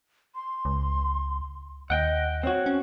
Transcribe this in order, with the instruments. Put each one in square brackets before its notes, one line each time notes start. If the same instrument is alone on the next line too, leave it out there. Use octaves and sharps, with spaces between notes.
[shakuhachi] C6
[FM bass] C#2
[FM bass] D#2 [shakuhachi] D#5 [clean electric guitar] F#5 G5
[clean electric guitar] C4 F#4 [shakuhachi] C#5
[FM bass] C#4